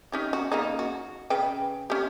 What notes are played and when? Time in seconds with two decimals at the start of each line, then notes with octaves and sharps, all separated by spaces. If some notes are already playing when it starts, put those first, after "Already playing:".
0.12 C#4 D#4 G4
0.33 F#4
0.52 C#3 A#3 D#4
0.79 F#4
1.30 C#3 B4 G5
1.90 C#4 G4